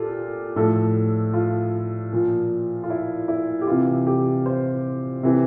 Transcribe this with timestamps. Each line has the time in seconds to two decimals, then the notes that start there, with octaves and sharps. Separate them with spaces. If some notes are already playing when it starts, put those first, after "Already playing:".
Already playing: A#2 F4 G4 A4
0.56 A2 F3 A4
1.33 F4
2.12 A#2 F3
2.83 F4
2.90 E4
3.28 E4
3.61 G4
3.67 C3 E3 F4
4.07 G4
4.46 C5
5.23 C3 E3